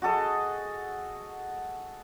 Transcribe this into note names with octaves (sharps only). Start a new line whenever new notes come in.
F#4 G#4 A4 D#5